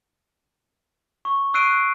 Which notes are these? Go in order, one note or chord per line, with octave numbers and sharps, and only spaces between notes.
C#6
C#6 E6 F#6 C7 D7 D#7